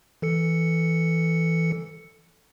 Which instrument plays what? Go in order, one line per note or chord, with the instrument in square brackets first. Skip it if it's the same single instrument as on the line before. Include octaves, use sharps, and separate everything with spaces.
[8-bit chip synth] E3 A4 C#7